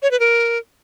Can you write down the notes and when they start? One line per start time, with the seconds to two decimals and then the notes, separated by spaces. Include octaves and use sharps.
0.02 C#5
0.11 B4
0.20 A#4